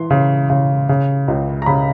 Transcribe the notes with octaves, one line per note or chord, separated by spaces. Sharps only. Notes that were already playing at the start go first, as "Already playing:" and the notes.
Already playing: E3 C6
C#3
C#3
C#3
C#2
A#5
C#3 B5